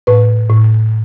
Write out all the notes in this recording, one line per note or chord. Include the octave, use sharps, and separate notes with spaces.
A2 B4
A2